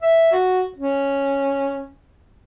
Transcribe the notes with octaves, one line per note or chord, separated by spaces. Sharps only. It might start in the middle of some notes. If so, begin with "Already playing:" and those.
E5
F#4
C#4